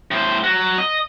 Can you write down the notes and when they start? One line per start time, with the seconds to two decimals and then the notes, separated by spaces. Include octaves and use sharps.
0.11 A2 C5
0.44 F#3 F#4
0.78 D#5